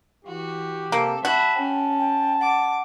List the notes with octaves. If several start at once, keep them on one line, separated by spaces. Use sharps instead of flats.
E3 F#4 G4
C3 A#3 A4
F#4 E5 A5 B5
C#4 G5 A5
G5
F#5 D6